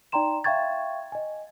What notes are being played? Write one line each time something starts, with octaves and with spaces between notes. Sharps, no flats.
D#4 D5 G5 A#5 C6 E7
E5 F5 G5 C#6 G#6 A6
D#5 G#5